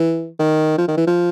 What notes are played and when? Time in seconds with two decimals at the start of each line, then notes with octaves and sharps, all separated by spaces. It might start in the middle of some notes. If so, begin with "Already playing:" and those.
Already playing: E3
0.39 D#3
0.78 F3
0.88 D#3
0.97 E3
1.07 F3